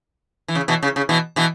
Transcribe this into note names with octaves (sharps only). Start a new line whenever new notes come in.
E3
C#3
B2 E3
C#3
C#3
B2 E3
B2 E3